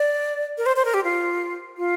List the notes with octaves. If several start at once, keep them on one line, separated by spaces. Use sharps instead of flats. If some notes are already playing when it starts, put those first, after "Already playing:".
Already playing: D5
A#4
C5
C5
A#4
G4
F4
F4